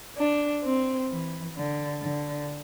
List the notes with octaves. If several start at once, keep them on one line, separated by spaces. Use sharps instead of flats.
D4
C4
E3
D3
D3